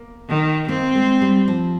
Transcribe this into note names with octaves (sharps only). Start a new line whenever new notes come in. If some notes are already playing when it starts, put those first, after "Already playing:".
Already playing: A#3
D#3
A#3 C4
G#3
G3
F3